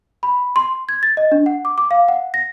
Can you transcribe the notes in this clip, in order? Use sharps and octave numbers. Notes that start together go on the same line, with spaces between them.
B5
C6
G#6
A6
D#5
D4
F#5
D6
D6
F5
F#5
A#6